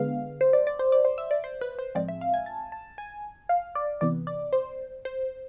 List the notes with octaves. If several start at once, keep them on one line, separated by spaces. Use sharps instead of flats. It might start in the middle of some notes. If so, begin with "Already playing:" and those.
Already playing: D3 G#3 B3 F5
C5
D5
D5
C5
D5
C5
E5
D5
C5
B4
C5
A2 F3 G#3 C4 D5
E5
F5
G#5
A5
A5
G#5
F5
D5
C3 E3 B3 D5
D5
C5
C5